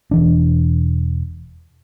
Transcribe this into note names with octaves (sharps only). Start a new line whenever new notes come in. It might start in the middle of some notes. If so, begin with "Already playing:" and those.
E1 E3 D4